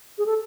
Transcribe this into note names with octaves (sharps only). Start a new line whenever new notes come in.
G#4
A4